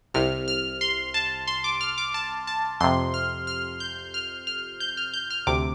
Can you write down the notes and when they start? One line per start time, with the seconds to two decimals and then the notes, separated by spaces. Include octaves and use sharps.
0.14 C2 C3 F6
0.48 F6
0.81 C6
1.14 A5
1.47 C6
1.64 D6
1.81 F6
1.98 D6
2.14 A5
2.47 A5
2.81 F2 C3 C6
3.14 F6
3.47 F6
3.80 G6
4.14 F6
4.47 F6
4.80 G6
4.97 F6
5.14 G6
5.30 F6
5.47 D2 C3 D6